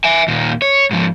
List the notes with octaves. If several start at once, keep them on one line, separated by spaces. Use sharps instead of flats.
E5 G#5
D#2 A#2
C#5
G#2 F3